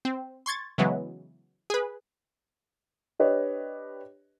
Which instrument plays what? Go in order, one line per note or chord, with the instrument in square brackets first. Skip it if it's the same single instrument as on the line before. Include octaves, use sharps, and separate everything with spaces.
[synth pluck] C4
C6 C#6 G#6 A6
C#3 E3 F#3 G#3 B3
G#4 B4
[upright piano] D4 G4 B4 C#5 D#5